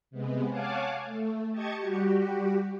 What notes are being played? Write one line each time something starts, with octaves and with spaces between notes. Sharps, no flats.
C3 G#3 B3
C#5 F5 F#5 G#5 A5 D6
A3
G4 D#5 A5 C#6 G#6 C#7
G3 F#4 G4